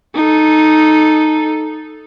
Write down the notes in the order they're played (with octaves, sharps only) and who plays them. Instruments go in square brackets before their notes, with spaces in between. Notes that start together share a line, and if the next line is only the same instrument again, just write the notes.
[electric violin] D#4 A4